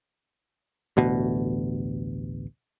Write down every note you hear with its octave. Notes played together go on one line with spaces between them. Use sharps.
A1 D2 B2